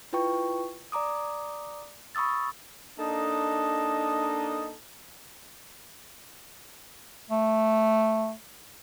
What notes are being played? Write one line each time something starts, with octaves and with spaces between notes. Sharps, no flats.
E4 F4 B4 G5 C#6
D5 A#5 D6 D#6
B5 C#6 D#6 E6 A6
A#3 D4 D#4 A4 D#5
A3